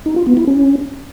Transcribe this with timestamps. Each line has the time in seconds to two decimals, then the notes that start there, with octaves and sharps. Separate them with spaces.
0.06 D#4
0.16 F4
0.27 B3
0.37 E4
0.47 C#4